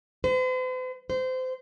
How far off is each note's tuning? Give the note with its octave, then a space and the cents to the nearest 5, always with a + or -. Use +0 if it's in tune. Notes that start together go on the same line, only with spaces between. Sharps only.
C5 -45
C5 -25